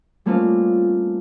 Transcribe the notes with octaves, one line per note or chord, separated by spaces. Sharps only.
G3 A3 A#3 C4 C#4 F4